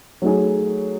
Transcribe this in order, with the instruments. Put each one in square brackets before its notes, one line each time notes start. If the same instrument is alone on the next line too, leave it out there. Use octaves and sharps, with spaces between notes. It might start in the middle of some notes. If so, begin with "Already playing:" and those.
[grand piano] F#3 A3 D#4 G#4